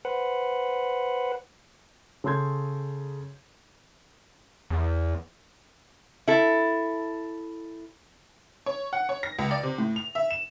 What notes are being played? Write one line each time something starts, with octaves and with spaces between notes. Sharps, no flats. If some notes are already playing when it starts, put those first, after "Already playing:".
B4 C5 F#5
C#3 A4 C6 G6 G#6
E2
E4 A4
C#5
F#5
C#5
A#6
C#2
D5
C3
A2
F7
E5
E7